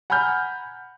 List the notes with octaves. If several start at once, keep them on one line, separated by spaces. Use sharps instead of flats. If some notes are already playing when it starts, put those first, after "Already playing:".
F#5 G#5 A#5 B5 F6 G6